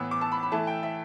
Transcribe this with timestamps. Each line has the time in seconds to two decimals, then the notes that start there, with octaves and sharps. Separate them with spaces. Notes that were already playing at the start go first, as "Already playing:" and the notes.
Already playing: A2 E3 B3 E6
0.11 D6
0.21 A5
0.32 B5
0.43 B5
0.52 E3 A3 E4 A5
0.67 G5
0.83 E5